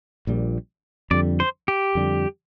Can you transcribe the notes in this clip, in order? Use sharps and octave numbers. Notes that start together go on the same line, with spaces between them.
A#1 A#2 G3
F2 D3 G3 D5
C5
G4
F2 D3 G3